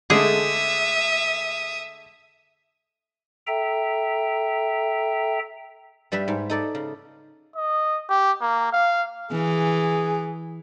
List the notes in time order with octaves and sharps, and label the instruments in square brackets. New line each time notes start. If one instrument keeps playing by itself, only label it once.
[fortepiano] D3 G#3 A3 [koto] G#4 [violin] E5 D#6
[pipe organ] A4 E5 G5 A#5
[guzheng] G2 G3 B4 E5
G#2
D#4 A4 D5
C#3
[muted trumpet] D#5
G4
A#3
F5
[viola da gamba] E3 [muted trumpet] G#4